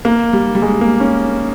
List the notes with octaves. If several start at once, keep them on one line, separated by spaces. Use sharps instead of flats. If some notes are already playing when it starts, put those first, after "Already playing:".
A#3
G3
G3
G#3
A#3
C#4